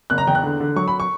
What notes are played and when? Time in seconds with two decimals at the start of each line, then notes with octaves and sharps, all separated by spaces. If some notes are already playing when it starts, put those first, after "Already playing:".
0.10 F#1 F#6
0.18 A#5
0.27 E2 G5
0.35 F#6
0.44 D3
0.60 D3
0.76 F#3 C#6
0.88 B5
1.00 C#6